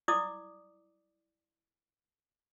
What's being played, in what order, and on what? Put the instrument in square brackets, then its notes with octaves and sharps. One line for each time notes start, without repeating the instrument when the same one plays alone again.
[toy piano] E4 D5 D6 D#6